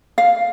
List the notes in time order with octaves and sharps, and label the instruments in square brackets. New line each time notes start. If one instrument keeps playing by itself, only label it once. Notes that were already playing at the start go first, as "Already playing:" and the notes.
[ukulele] F5